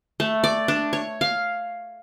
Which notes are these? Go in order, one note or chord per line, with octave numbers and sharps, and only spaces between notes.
A3
D5
D4
C#5
F5